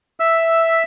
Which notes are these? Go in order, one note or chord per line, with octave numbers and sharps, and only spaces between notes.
E5 E6